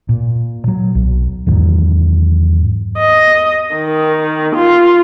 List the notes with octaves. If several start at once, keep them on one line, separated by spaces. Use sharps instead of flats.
A#2
F#3
B1
E2 G#2 D#3 F#3
D#5
D#3
F4